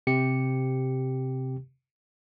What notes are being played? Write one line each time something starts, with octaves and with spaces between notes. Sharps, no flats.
C3 G4 C#7